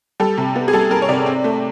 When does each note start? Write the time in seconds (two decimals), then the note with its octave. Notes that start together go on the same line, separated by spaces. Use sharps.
0.20 G3 A4
0.38 C3
0.56 B3
0.68 G#4
0.73 G3 A4
0.91 G3 A#4
1.02 C#5
1.09 C3 D5
1.26 C4
1.44 A3